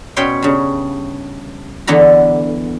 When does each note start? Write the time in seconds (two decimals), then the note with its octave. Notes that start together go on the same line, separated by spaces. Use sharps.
0.16 B2 C#4 B4 C#5 G5 C6
0.42 G2 C#3
1.87 E2 D3 E3 B3 B4 A#5